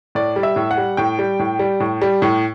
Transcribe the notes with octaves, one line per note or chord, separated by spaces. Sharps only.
A2 D5
G3
E5
A2
F#5
G3
A2 G5
G3
A2
G3
A2
G3
A2